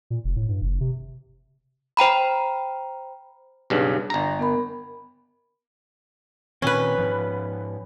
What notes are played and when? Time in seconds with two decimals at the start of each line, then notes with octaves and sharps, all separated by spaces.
0.10 A#2
0.24 F1
0.36 A2
0.49 G2
0.61 F#1
0.81 C3
1.97 C5 G5 A#5 B5
3.70 B1 G2 C#3
4.10 G1 A#5
4.39 B3 A#4 B5
6.62 A#2 D#3 C4 C#4 B4
6.97 G#2 F3